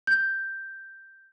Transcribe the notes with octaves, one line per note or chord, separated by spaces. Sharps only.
G6